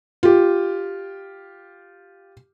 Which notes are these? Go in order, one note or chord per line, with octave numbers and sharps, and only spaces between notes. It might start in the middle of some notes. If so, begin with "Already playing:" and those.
F4 G4